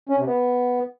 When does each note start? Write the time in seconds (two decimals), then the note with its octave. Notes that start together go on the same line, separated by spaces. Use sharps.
0.09 C#4
0.18 C3
0.26 B3